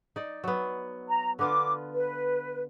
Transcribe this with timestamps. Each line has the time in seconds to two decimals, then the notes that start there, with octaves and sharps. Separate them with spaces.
0.16 D#4 D5
0.44 F#3 B3
1.08 A#5
1.39 D3 B3 F4 D6
1.94 B4